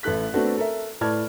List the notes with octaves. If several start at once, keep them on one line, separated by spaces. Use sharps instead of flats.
A1 E4 A4 F#6 B6
A3 B3 C4 D4 F#4 A4
A4 A#4 E5
A2 B4 D5 A5 F6 G#6